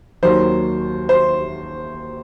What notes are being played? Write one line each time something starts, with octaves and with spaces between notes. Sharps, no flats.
D#2 D#3 F#3 C5
C5